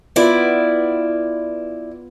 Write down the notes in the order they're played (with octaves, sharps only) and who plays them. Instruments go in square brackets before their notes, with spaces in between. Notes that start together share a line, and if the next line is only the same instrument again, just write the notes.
[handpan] B3 F4 B4 [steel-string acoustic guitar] E4 D5